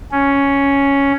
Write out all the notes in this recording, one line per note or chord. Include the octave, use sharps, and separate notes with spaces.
C#4